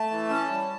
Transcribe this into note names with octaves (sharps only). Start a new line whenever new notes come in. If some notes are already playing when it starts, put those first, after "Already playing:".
Already playing: A3 A5
E3
C#4
G3